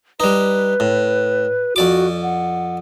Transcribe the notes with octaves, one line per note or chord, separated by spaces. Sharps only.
G3 D#4 B4
A2
F2 F#4 D5 D6
F#5